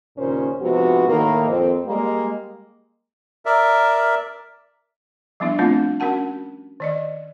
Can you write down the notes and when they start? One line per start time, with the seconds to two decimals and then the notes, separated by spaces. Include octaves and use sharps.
0.17 D#2 A#2 C#3 C#4 A#4 C5
0.60 G#2 C3 F3 B3 F#4
1.07 A2 D#3 A#3
1.48 F2 C4
1.85 G3 G#3 A#3
3.45 A#4 D5 E5
5.40 F3 G3 B3 D4 E4
5.59 A3 B3 C4 D4 F4
6.00 C#4 F#4 A#4 F#5 A5
6.80 D#3 D5 D#5